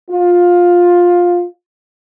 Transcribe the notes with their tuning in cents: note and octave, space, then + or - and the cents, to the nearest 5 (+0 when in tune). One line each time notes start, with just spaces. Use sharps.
F4 +15